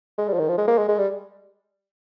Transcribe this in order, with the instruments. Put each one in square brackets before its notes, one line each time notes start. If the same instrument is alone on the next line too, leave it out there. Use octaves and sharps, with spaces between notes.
[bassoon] G#3
G3
F3
D#3
F3
G#3
A#3
G#3
G#3
G3